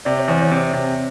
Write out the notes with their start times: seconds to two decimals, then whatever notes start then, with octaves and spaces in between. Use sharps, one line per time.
0.05 C3 D5
0.18 C#5
0.28 E2 C5
0.42 C#5
0.51 C3
0.74 C3